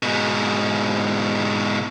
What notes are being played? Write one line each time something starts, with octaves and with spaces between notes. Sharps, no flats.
G#2 B2